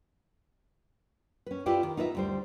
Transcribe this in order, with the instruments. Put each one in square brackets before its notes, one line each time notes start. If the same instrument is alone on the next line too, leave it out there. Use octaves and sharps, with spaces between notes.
[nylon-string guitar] C#4 B4
E4 F4 G4 B4 D5
D#3
D#4 F4 B4 D#5 E5
D2 G3 C5